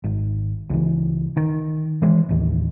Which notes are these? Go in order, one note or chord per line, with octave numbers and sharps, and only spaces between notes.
G#1
C#2 E3
D#3
E3 G#3
A1 D#2